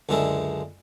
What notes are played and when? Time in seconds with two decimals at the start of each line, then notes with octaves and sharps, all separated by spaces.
0.09 C#2 F#2 D3 G#3 D4 E4